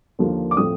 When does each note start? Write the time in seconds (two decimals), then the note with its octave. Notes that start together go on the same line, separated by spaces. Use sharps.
0.19 D#2 D3 F3 A#3
0.51 D6
0.57 A2 F3 A3 C4 D#6